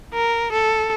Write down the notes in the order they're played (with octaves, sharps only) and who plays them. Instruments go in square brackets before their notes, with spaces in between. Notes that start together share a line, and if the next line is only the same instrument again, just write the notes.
[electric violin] A#4
A4